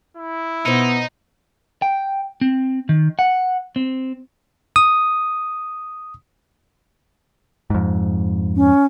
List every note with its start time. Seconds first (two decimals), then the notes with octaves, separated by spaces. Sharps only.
0.17 E4
0.65 B2 B3 D#4 C5
1.82 G5
2.41 C4
2.89 D#3
3.19 F#5
3.76 C4
4.76 D#6
7.70 F2 G#2
8.56 C#4